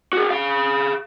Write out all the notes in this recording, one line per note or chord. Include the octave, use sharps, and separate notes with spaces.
F#4 G#4
G#4 F5